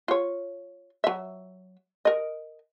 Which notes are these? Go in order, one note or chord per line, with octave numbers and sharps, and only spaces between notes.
F4 C#5
F#3 E5
A#4 D#5